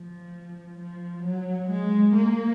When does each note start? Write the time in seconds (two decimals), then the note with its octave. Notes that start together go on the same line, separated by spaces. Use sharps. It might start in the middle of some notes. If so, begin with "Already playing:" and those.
Already playing: F3
0.78 F3
1.23 F#3
1.69 G#3
2.14 A#3